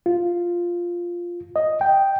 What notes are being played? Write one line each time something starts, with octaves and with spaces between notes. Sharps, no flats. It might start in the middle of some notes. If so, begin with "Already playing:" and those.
F4
D#5
G5